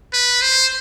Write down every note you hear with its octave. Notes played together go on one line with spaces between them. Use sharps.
B4
C5